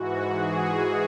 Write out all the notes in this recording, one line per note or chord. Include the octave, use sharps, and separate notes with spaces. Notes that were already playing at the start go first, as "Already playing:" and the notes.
Already playing: G#2 E3 F#4
G#4